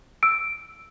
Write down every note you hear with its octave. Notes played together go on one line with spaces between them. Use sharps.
E6 D7